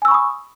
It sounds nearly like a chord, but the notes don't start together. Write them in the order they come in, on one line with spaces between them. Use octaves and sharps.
G#5 E6 C#6 B5 D#6